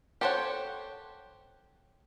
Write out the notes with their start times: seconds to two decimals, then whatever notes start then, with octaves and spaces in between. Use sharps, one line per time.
0.21 G4 A4 C5 C#5 F#5